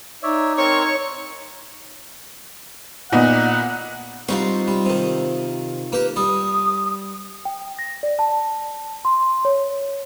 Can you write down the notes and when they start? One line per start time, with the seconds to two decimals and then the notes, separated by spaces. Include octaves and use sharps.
0.23 D#4 C#5 D5 E5
0.58 C4 A#4 C5 C#5 C#6
3.12 A#2 B3 D#4 F#5
4.28 G3 C4 D#4 F4 F#4
4.67 G3
4.86 C3 D#3
5.92 A#3 G4 B4
6.16 G3 D#6
7.45 G5
7.79 A#6
8.03 D5
8.19 A5
9.05 C6
9.45 C#5